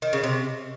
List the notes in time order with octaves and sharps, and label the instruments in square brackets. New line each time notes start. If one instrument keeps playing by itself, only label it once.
[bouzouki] D#3
C#3
C3